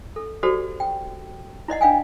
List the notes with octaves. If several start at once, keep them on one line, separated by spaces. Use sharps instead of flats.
A4
F#4 G4 A4 C5 D5
G5
E4 D5 D#5 F#5
D4 D5 F5 G5 G#5